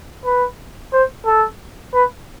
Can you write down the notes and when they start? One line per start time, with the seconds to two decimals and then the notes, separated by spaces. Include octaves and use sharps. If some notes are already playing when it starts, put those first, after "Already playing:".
0.25 B4
0.93 C5
1.26 A4
1.93 B4